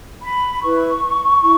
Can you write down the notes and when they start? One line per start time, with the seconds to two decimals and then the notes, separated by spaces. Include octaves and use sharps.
0.23 B5
0.63 E4 B4 C#6
1.42 E4